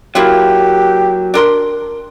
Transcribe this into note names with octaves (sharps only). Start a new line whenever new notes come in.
F#3 A#3 E4 F4 G4
D4 A#4 C6